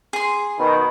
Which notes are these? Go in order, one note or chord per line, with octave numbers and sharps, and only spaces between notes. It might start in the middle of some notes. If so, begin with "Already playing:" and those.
G#4 C6
B2 D#3 B5